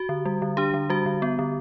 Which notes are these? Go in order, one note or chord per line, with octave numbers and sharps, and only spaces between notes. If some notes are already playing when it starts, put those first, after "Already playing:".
Already playing: F#4
D3
G3
D3
D4 G4
D3
G3 F#4
D3
B3
D3